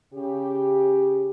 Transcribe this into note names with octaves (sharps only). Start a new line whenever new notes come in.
C#3 G4